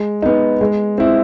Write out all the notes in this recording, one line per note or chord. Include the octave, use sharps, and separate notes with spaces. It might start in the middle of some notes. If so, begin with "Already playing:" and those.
Already playing: G#3
B3 D#4
G#3
C4 E4